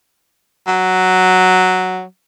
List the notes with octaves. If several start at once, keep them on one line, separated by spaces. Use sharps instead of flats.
F#3